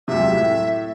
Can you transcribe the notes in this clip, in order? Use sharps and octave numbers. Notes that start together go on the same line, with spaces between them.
C#2 F#2 C3 E5
A2